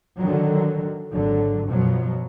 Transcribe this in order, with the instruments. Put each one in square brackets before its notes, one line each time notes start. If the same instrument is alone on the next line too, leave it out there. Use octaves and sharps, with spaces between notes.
[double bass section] D3 D#3 F#3
G#1 D3 F#3
F#2 B2 F3 F#3